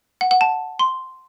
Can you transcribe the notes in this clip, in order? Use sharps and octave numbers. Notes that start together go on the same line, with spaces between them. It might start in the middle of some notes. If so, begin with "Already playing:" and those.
F#5
F#5
A5
C6